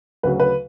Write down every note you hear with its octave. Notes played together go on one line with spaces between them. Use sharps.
D2 C#3 F#3 B4
B4